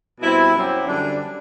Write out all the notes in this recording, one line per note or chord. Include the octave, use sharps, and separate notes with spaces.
B2 G3 C4 E4
F#2 F#3 C4 G4
F#2 D3 G3 D4